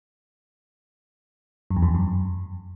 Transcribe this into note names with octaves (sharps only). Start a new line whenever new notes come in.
F#2
E2
F2
E2
F#2